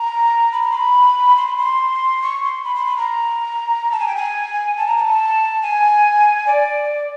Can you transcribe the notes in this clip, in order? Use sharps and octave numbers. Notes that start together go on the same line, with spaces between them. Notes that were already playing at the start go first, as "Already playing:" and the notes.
Already playing: A#5
B5
A#5
C6
B5
C6
B5
C6
C#6
C6
B5
C6
B5
A#5
A5
G#5
G5
G#5
A5
A#5
A#5
A5
G#5
D5